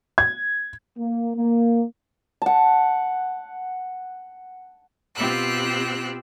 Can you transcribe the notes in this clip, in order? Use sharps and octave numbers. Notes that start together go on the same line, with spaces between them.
G#6
A#3
A#3
F#5 A5
B2 C4 F4 G4 E6 F#6